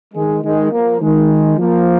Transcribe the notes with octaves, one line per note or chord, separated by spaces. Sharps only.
D#3 G#3
D#3 G#3
F3 A#3
D#3 G#3
F3 A#3